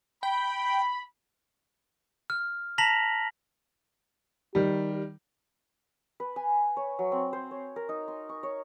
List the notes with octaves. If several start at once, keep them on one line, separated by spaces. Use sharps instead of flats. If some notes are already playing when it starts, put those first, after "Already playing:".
G5 B5
F6
A5 A#5 A#6 B6 F7 F#7
D#3 G3 G4
B4
G#5
C#5
F#3
C4
C5
C#5
A#4
D#4
C6
C#6
C#5